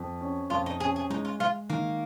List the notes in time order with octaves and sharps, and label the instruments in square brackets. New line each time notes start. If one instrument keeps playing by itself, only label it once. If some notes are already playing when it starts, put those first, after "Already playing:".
Already playing: [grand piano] F2
C#4
[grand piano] F2 [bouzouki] F4
[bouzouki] D#4
[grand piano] C#4 [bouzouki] G#4
[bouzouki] G#4
[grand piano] G#3 [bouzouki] D#4
[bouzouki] F4
[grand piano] G#3 [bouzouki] F4
[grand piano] D#3 [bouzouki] A#3